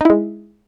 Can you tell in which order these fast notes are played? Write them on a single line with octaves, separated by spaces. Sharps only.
D#4 E4 G#3